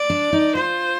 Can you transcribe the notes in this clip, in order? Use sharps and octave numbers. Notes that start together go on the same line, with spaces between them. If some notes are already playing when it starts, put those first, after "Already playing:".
Already playing: D5
D4
D#4
F4 C5